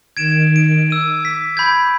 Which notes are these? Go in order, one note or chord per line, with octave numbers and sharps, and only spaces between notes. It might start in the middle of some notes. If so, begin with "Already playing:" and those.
D#3 G#6 D7 E7
D7
D6 E6 D#7
B6
B5 G6 G#6